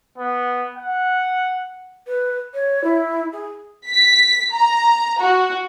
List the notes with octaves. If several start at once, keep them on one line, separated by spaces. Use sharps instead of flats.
B3
F#5
B4
C#5
E4
G#4
B6
A#5
F#4